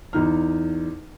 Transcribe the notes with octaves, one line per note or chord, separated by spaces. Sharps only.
E2 D#4 F6